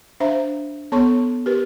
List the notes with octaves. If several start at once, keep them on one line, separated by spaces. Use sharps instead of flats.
D4 C5 E5 F5 A#5
B3 A4 C#5 A5 C6 C#6
G4 A#4 B4